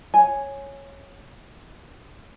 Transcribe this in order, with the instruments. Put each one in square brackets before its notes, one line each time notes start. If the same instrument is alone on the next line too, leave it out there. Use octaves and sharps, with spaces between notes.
[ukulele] C#5 G#5